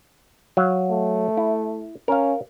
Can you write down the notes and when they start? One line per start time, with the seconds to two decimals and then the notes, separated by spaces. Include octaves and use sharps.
0.57 F#3 F5
0.90 A3
1.37 E4
2.08 C#4 A#4 F5